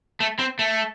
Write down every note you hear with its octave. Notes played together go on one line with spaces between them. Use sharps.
A3
C4
A3